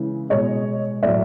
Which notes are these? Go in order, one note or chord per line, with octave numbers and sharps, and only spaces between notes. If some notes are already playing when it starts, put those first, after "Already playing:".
Already playing: C#3 E3 G#3
B2 G#3 C#5 D#5
A2 F#3 D5 E5